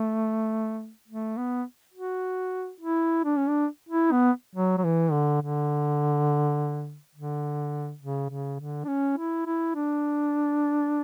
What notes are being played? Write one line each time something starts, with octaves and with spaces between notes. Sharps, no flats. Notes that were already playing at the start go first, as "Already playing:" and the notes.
Already playing: A3
A3
B3
F#4
E4
D4
C#4
D4
E4
B3
F#3
F#3
E3
D3
D3
D3
C#3
C#3
D3
D4
C#4
E4
E4
D4